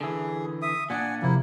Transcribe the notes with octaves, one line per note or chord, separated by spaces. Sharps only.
D3 E3 G#4
E5 D#6
A#2 D4 F#5 G#5
E2 C3 F3 A#3 E4